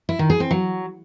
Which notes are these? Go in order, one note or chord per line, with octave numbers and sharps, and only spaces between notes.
E4
D#3
G#4
C4
F#3